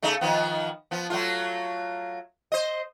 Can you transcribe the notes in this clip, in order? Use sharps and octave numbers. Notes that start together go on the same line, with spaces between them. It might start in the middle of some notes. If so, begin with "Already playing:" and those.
C#3 A3 D#4
D#3 F3 B3
F3 B3
F#3 A3 F4
C5 D#5